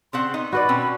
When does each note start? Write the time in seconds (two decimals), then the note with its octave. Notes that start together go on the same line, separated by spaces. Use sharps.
0.13 C#3 C4 F#5 C6
0.34 B3 D#4
0.53 F#4 B4 D5 B5
0.69 B2 C4 C#4